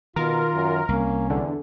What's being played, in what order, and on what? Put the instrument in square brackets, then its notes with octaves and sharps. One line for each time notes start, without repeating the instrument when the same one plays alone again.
[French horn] B2 [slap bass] D#3 [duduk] F4 [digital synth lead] A#4
[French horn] F#2
[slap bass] C2 [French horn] A#3 [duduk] C#4
[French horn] E2 [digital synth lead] D3